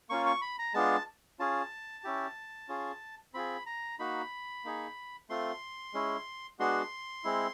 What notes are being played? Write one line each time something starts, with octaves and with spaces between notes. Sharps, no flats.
A#3 C#4 F4 C#6
C#6
B5
A#5
G#3 B3 D4 F4 A5
C#4 F4 G#4 A5
C#4 E4 G4
C#4 F4 G#4
C4 F4 G#4 B5
A#5
A#3 D#4 F#4 B5
A#3 D#4 G#4
A3 C4 F4 C6
G#3 C#4 E4
G#3 B3 D4 F#4 C6
G#3 C4 E4